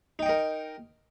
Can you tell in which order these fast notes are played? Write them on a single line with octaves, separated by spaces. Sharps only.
D#4 G5 D#5 A#4